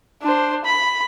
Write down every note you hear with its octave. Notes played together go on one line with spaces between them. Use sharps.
D4 C5
B5